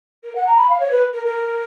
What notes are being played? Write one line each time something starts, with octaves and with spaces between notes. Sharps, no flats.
A#4
F#5
A#5
B5
F5
C#5
B4
A#4
A#4